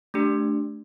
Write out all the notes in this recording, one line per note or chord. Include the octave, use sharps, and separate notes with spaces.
A3 D4 G4